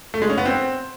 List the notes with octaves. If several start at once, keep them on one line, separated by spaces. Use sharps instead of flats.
A3
G#3
C#4
B3
C4